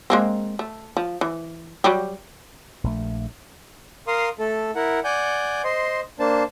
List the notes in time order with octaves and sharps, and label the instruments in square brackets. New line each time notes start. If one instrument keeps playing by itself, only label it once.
[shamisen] G#3 A#3 C4
A3
F3
E3
F#3 G3 G4
[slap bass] A#1 A3
[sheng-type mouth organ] A#4 F5 C6 D#6
A3 A4
E4 A#4 F#5
D5 F#5 G#5 G6
C5 D#5 C6
A#3 D4 C5 A5